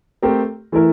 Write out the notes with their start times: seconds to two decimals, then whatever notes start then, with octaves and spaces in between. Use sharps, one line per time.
0.22 A3 C4 G4 A#4
0.72 E3 A3 E4 A#4